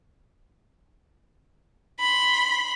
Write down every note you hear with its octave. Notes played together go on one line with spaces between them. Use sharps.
B5 C6